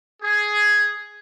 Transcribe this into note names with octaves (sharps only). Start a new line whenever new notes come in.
G#4